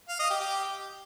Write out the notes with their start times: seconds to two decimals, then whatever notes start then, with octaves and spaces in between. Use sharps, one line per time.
0.09 F5
0.20 D#5
0.30 G4
0.41 G4